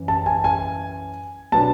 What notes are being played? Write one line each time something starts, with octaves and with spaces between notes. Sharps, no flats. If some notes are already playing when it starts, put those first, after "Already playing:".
Already playing: F#2 E3 C#4
A5
G#5
G#5
B2 F#3 B3 D4 A5